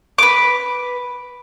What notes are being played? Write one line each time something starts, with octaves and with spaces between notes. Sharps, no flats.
B4 D6